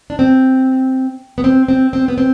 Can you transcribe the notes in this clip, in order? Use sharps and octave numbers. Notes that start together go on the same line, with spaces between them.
D4
C4
B3
C4
C4
C4
B3
C4